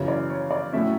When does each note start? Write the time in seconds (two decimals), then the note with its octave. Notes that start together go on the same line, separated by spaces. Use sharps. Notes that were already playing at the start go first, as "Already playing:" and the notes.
Already playing: F#2 C#3 E3 C#5
0.08 D5
0.30 C#5
0.51 D5
0.72 A2 F#3 A3 C#4 E5